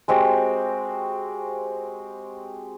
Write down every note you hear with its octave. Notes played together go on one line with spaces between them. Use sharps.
G#3 C4 F#4 G4